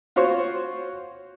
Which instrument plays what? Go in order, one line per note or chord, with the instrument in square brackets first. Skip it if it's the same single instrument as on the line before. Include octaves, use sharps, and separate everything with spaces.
[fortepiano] F4 F#4 C5 C#5